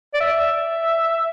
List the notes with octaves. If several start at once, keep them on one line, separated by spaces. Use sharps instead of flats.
D5
E5